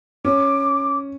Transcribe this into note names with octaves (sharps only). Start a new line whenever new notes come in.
C#4 D6